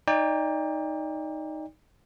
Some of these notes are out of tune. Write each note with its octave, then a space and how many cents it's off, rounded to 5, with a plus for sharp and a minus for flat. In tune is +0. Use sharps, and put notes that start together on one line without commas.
D#4 +0 D5 -15 G5 +35